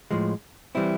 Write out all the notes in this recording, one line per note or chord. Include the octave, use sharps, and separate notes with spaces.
A2 F3 G#3
E3 G3 C4 E4